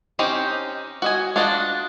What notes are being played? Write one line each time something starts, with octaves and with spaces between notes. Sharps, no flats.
C4 C#4 D#4 G4 D#5
F#4 D#5 G#5
D4 F4 F#4 D5 D#5